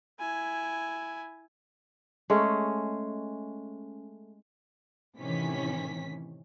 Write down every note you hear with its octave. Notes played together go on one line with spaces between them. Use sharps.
E4 G#5
G#3 A3 C#4
A2 C3 D#3 E3 C#4 B6